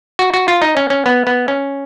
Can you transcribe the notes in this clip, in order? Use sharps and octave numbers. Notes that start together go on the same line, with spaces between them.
F#4
F#4
F4
D#4
C#4
C#4
B3
B3
C#4